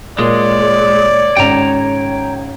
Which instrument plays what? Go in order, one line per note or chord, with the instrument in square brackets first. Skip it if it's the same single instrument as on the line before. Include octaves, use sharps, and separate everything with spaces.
[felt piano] A#2 [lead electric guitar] G#3 [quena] C#5 [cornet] D5
[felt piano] G#1 C#3 [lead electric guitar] G5 A#5